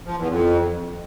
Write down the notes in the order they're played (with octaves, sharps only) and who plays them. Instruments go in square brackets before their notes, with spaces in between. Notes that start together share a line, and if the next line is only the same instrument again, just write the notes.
[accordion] F3
E2
F2